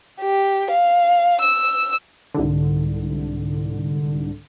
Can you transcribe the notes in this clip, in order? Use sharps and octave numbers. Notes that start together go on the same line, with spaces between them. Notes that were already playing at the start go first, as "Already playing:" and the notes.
G4
F5
E6
C2 G#2 D3